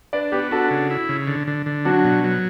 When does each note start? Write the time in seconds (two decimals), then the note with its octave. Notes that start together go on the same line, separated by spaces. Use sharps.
0.13 D4 B4 D5
0.32 B3 G4 B4
0.51 D4 F#4 A4
0.71 C#3
0.90 E4
1.09 C#3
1.27 D3
1.47 D3
1.66 D3
1.85 F#3 D4 F#4
2.04 B2
2.24 F#3